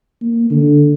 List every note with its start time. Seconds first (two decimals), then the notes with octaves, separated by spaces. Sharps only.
0.22 A#3
0.51 D3